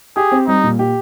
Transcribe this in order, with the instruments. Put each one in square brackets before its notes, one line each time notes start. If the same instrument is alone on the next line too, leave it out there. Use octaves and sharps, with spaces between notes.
[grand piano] G4 [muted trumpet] G#4
[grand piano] C4
[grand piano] G3 [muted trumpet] D#4
[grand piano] A#2
G4